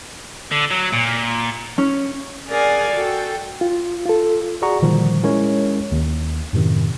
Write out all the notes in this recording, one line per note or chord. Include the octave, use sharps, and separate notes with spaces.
D3
F#3
A#2
C#4
G#4 A#4 D5 F5 F#5 G#5
F#4 A4 G5
F4
F4 A4
F#4 G#4 D5 F#5 A#5 C#6
A#2 D3 D#3 F3 G3
G#3 C#4 E4 A#4 C#5
D#2
F#2 A2 C3 D#3